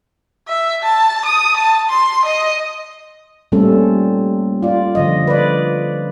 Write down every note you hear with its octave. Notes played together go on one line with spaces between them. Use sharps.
E5
A5
D#6
A5
C6
D#5
A#2 G3 A3 C4 C#4 A4
F4 D5
D3 F3 D#5
B4 D5